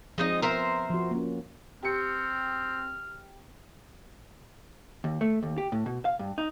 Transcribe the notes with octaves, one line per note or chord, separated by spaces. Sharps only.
F3 G#3 C4 D#4 D#5
B3 A#4 C5 E5
F3 F#4
A#3 C#4
C4 G4 F6 C#7
D#2
A3
D#2
G4
A2
B2
F5
G2
D#4